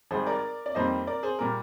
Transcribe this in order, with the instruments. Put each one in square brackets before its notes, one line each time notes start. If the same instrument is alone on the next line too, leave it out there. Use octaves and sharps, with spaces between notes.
[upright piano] G#1 G#2 G3 G#4 C5
A#4 D5
D5
F2 D#3 G3 A#3 C5 D#5
A#4 D5
G#4 C5
A#2 G3 A#4